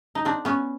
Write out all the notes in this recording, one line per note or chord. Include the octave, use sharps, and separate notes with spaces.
D#4
C4 D4
B3 C#4